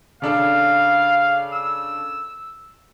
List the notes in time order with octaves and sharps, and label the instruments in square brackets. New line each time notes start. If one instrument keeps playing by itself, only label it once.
[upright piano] C#3 D4 A4 [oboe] F5
[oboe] E6